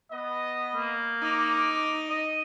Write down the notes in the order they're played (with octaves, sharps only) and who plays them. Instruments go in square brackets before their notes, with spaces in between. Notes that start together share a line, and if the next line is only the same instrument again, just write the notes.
[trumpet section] B3 D#5
[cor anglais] A#3
[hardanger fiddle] D#4 [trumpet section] D6
[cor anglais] D#5